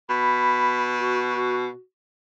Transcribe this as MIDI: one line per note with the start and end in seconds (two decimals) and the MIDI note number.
0.10 1.69 47
0.10 0.81 83
0.99 1.80 66